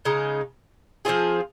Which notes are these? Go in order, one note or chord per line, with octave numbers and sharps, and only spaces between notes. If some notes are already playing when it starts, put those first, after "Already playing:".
C#3 G#3 D#4
F3 C4 F4 G#4